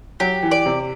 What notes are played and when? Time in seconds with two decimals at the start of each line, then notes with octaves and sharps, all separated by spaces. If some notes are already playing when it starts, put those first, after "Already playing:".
0.20 F#3 G4
0.43 E3
0.51 D5
0.66 C3